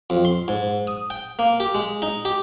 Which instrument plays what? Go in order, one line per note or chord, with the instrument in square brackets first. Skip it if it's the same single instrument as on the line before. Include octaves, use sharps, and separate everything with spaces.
[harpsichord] F2
C6
G#2
D#6
G5
A#3
G4
G#3
D#4
G4